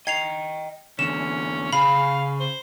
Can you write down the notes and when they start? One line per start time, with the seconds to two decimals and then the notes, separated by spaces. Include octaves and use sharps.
0.07 D#5 G5 G#6 C7 F7
0.99 E2 D3 C#4 E7
1.73 C#3 G#4 F5 B5
2.40 C5